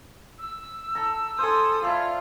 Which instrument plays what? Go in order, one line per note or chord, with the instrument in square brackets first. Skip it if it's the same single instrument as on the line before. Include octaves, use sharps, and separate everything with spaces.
[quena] E6
[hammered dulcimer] A4 A#5
[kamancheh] A4 D#6 [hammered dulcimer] C5 G#5
[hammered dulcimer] E4 A4 D5 [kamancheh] F4